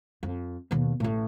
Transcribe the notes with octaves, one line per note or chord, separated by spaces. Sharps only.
F2
D#2 B2
A1 A2